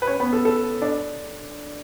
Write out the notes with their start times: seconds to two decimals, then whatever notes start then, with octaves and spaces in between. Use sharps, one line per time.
0.02 B4
0.07 C#4 C#5
0.20 B3 B4
0.33 A4
0.45 A4
0.82 D4 D5